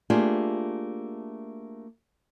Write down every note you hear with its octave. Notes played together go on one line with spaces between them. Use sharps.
A3 A#3 D4 F4 G4 G#4